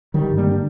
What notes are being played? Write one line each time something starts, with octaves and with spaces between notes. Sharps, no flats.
D3 D#3 G3
G2
G3 A#3
D3 D4